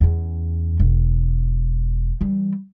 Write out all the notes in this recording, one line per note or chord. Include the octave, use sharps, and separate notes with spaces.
E2 C#4
E1
E3 G3